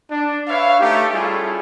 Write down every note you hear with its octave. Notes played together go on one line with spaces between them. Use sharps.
D4
B4 C#5 E5 F5
A3 D#4 G4
G3 C#4 E4 F4 G#4 A4